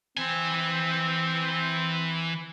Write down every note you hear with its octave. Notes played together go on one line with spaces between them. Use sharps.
E3 C4 G#5